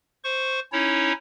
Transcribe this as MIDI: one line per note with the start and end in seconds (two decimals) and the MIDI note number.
0.24 0.60 72
0.24 0.60 85
0.72 1.12 61
0.72 1.12 63
0.72 1.12 64
0.72 1.12 73